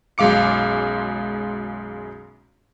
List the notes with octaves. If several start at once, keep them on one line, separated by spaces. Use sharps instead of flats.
B1 F#2 G#3 F5 D6 C#7